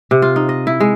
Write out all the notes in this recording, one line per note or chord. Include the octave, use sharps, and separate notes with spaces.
C3
F4
D#4
D#5
E4
G#3